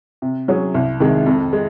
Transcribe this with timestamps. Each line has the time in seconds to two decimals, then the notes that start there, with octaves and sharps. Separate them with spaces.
0.22 C3
0.48 F#3 C#4 G#4
0.75 C2
1.00 C3 D#3 G#3
1.26 F2
1.53 G#3